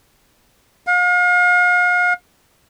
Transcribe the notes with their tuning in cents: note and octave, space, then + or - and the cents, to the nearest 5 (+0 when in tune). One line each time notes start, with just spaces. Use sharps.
F5 +40